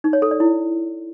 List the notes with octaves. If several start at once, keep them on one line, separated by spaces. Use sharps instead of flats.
D#4
C#5
A4
D5
E4